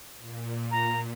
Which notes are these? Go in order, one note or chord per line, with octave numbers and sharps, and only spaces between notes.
A#2
A#5